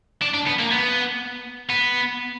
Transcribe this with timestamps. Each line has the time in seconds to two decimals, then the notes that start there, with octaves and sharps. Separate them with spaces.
0.22 D4
0.34 D4
0.47 B3
0.59 A#3
0.72 B3
1.69 B3